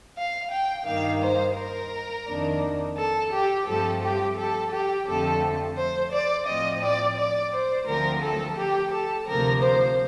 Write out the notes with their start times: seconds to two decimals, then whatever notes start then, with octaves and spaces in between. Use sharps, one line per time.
0.17 F5
0.52 G5
0.87 G2 D#3 A#3 F5
1.22 C5
1.57 A#4
2.28 F2 D#3 A#3 D4
2.98 A4
3.32 G4
3.67 G2 F3 A3 C4 A4
4.03 G4
4.38 A4
4.73 G4
5.08 F2 D3 F3 A3 C4 A4
5.78 C5
6.12 D5
6.47 A2 F3 C4 D#5
6.82 D5
7.17 D5
7.53 C5
7.87 D2 D3 F3 A3 C4 A#4
8.22 A4
8.58 G4
8.92 A4
9.27 D2 C3 F3 A#3 A#4
9.63 C5